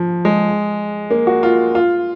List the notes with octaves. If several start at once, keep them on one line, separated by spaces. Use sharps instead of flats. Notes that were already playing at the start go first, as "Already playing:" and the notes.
Already playing: F3
G#3
A#3
F#4
F4
F4